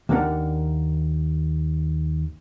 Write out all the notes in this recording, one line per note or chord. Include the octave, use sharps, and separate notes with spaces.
D#2 A#3 D4 A#4 F#5